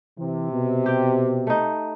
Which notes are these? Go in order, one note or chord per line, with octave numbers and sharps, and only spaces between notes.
C3 E3
B2
G4 G5
A3 D#4